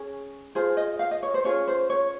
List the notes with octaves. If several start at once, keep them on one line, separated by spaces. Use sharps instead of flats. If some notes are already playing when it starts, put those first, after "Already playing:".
Already playing: C#4 G#4 C#5
F4 G#4 C5
D#5
F5
D#5
C#5
C5
C#4 F4 G#4 C#5
C5
C#5